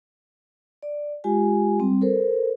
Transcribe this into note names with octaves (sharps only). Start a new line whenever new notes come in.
D5
G#3 F4 G4 G#5
G3 C4
A4 A#4 C5